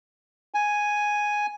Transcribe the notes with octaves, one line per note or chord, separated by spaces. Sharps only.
G#5